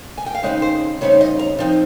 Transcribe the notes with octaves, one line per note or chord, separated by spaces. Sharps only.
G#5
G5
F5
C#3 G#3 C4 D#4 D#5
C5
C#3 G3 C4 D#4 C#5
D#5
A#5
F3 C4 D#4